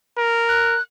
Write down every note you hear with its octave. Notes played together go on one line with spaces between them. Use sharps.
A#4
F#6